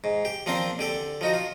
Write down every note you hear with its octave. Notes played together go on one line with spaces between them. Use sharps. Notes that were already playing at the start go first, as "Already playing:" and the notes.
G#2
G4
F3 A#3 C4 D4 C5
D3 G4 A4
F3 D#4 F#4
F4